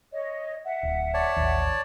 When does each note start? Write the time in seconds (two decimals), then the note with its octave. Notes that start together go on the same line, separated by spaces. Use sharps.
0.11 C#5 D#5
0.63 E5 F#5
0.83 D1
1.14 C#5 D5 A5
1.36 A1 D#2